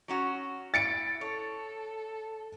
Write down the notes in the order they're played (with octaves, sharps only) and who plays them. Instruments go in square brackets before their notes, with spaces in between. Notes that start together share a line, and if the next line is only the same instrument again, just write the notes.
[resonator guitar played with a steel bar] F#3 C#4 F#4
[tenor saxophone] E4 [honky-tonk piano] A6 C#7 D7
[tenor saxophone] A4 [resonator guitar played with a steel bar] C#5